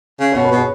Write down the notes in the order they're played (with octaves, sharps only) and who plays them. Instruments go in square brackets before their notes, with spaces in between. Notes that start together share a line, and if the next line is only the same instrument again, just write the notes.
[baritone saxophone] C#3
[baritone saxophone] B2 [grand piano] C#5
[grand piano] B4
[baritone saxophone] B2
[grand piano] G#4 C#5